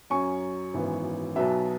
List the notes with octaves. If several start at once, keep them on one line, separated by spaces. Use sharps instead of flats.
F#2 F#3 C#4 G#5 C#6
G#1 F#2 E3 B3
B1 B2 F#3 B3 E5